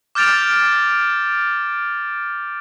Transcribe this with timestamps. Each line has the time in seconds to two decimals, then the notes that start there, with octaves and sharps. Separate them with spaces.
0.15 D6 F6 G6 A6 D7 F7